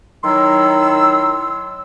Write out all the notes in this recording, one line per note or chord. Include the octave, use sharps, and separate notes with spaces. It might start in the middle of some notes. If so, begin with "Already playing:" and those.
D#3 F#3 E4 C6 E6